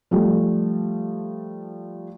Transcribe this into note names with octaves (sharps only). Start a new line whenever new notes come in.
F3 G3 A3